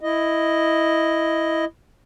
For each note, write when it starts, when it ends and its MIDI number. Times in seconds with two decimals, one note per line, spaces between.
0.01 1.65 64
0.01 1.65 75